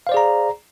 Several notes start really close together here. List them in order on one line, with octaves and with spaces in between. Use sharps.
F5 C5 D5 G#4 A#5